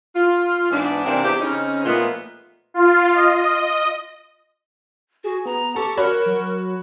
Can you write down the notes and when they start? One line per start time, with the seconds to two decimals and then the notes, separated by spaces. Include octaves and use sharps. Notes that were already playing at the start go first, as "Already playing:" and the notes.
0.16 F4
0.71 G#2 E3 B3 D4
1.04 C3 E3 A#3 C4 D4
1.23 E2 G4
1.40 C#3 C4 C#4 D#4
1.84 A#2 F3 G#3 A3 B3
2.74 F4
3.14 D#5
5.24 F#4 G#4
5.46 B3 A#5
5.76 G4 A4 C#6
5.97 F#4 A#4 C#5 B5
6.26 F#3